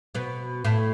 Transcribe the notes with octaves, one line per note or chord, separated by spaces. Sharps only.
B2 B3
A2 A3